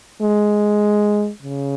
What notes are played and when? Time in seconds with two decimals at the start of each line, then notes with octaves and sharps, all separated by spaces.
0.22 G#3
1.42 C#3